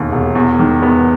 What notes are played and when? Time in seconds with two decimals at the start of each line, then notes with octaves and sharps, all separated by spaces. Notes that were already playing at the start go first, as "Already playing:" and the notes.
Already playing: E1 D#2
0.12 E1
0.35 E2
0.59 D#3
0.82 B3